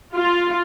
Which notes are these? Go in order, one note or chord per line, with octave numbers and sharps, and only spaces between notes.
F4